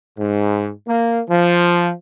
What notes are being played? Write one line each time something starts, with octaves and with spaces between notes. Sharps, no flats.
G#2
A#3
F3